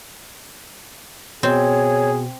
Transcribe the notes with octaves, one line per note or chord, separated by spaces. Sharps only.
B2 C4 G#4 C#5